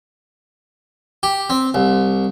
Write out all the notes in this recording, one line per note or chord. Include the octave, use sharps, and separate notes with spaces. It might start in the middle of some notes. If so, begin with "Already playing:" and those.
G4
C4
C2